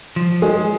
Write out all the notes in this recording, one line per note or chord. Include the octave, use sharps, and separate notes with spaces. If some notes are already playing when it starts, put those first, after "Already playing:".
F3
G#3 G#4